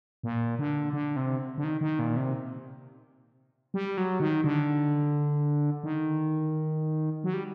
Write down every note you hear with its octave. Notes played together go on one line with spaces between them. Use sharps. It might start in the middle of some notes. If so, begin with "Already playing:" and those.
A#2
D3
D3
C3
D3
D#3
D#3
A#2
C3
G3
F#3
D#3
D3
D#3
F#3
G3